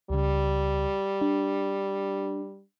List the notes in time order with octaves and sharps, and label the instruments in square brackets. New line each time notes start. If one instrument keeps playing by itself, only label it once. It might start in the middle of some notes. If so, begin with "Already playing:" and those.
[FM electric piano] C#2 C#3 [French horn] G3
[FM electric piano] D4